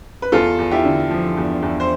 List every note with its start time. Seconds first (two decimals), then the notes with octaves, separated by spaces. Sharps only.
0.22 B4
0.32 E2 F4 A4
0.59 E2
0.71 E4 G4
0.85 D3
1.10 F3
1.37 E2
1.63 E2
1.80 C5